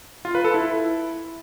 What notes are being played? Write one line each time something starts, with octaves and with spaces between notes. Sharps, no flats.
F4
B4
A4
E4